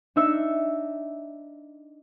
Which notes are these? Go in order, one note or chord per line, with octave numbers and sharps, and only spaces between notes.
D4 D#4 E5 E6 C#7 E7